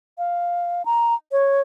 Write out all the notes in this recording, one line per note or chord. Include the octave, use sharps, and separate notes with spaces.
F5
A#5
C#5